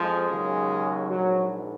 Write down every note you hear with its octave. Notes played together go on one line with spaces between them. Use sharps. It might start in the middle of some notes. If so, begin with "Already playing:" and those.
Already playing: F2 F3 G#3
D#2 C#3 F#3
A#1 G#2 F#3